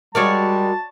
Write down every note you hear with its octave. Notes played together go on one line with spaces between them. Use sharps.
G3 G#3 F#4 A#4 C#5 D5 A5